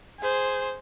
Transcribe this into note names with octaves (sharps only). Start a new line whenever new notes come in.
G#4 C5